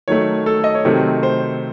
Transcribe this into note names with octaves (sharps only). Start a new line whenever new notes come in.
D#3 F#3 A3 C#5
A4
D#5
C#5
C3 D#3 F#3 A3 C5
C5